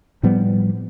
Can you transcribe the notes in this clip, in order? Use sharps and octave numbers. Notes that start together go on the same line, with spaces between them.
A2 F3 G3 B3